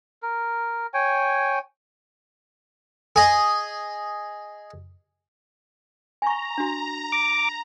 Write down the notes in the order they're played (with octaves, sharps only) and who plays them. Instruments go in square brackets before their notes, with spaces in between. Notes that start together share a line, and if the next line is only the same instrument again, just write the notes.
[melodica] A#4
C#5 G5 G#5
[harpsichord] G#4 D#5
[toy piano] G#5 C#6 [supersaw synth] A#5
[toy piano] D4 F#4
[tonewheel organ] D6